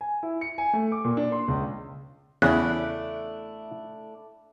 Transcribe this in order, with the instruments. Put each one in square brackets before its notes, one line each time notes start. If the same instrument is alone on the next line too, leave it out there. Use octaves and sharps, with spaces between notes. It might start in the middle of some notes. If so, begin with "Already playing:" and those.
[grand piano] G#5
E4
C#7
G#5
A3
D6
A#2
D4
C6
C#2
[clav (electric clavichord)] E2 C#3 [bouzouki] A3 D4 E4 [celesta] F#6